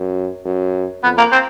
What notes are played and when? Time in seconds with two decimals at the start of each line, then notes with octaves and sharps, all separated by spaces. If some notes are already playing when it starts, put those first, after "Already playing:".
Already playing: F#2
0.45 F#2
1.03 F2 B3
1.18 A#3
1.32 C4